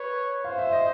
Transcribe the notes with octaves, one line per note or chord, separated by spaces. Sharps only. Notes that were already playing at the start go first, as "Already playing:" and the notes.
Already playing: B4 C#5
C5 F5
E5
D#5